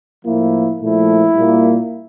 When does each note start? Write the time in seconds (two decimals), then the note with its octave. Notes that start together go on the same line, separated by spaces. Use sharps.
0.24 A2 F3 A#3 E4
0.80 A#2 F3 A3 E4
1.34 A#2 G3 A#3